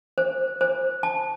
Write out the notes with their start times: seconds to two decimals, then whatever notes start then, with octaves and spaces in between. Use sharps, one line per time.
0.18 C5
0.61 C5
1.03 A5